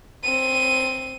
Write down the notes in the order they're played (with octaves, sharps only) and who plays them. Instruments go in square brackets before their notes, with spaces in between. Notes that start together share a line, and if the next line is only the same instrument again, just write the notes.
[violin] C4 D#7